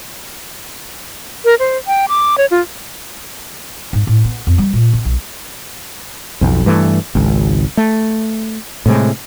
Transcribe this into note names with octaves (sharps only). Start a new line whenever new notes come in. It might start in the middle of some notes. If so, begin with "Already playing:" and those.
A#4
C5
G5
D6
C#5
F4
G#2
A2
B3
F2
G3
A#2
C3
B1
B1 F2
G2 E3 A3
G#1 C#2
A3
A2 C3 G#3